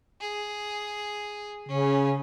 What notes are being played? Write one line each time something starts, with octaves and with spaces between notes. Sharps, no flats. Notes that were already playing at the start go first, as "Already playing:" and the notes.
G#4
C#3 C#4